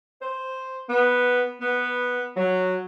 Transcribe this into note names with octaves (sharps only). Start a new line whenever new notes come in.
C5
B3
B3
F#3